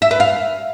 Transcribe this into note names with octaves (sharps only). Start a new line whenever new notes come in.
E5
B4
F5